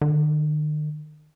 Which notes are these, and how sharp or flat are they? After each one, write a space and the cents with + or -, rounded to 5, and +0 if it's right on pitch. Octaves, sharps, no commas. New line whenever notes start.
D#3 -45